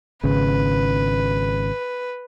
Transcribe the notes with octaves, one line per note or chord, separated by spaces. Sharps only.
G#1 C#3 B4